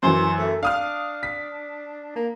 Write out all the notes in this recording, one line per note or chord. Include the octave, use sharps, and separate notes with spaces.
F#2 E3 C5
A3
D4 F5 D#6 F6
B6
A#3